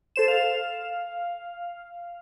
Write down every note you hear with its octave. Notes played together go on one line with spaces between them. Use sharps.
A4 C5 E7
F5